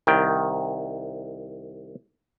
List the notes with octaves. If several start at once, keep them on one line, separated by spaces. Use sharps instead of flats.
C2 D#3 G5